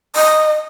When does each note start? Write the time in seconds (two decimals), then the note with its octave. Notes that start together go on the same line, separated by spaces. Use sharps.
0.16 D#5